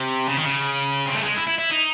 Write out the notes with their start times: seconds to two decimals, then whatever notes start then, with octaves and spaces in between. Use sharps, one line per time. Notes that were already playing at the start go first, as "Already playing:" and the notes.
Already playing: C3
0.29 C#3
0.37 D#3
0.44 C#3
1.06 C4
1.15 A3
1.24 G#3
1.36 E4
1.47 E4
1.58 E4
1.70 D#4